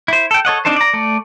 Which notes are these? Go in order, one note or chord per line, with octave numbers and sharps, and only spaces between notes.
E4 C5
A4 G5
A4 C#5 D#5 F#5
C4 D4 D#4 A4 C5
D5 A#5
A3 D5